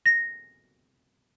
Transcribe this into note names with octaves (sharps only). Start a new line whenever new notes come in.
A#6